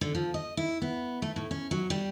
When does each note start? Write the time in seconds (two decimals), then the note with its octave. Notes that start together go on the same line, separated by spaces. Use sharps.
0.01 D3
0.15 F3
0.34 D#5
0.57 E4
0.82 B3
1.22 A3
1.36 A2
1.51 C#4
1.71 F#3
1.90 G3